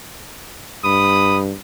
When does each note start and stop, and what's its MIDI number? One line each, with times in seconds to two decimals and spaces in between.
0.84 1.53 43
0.84 1.41 83
0.84 1.41 87